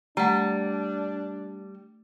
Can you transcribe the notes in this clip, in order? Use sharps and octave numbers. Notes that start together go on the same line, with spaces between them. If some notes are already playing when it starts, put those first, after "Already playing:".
G3 A3 D4 F#5 A#5